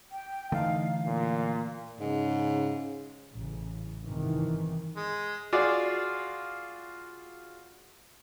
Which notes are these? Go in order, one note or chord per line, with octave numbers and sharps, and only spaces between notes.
G5
D3 E3 A3 D#4 F5
A#2 F5
G#2 C#3
A1 C#3
G1 G#2 C3 D#3 E3
G#3
F4 F#4 G#4 D5